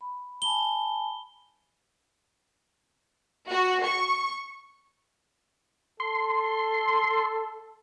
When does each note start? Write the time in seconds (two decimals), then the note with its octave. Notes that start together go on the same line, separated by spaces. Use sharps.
0.01 B5
0.42 G#5 A5 B5 G7
3.49 F#4
3.84 C#6
6.00 A4 C6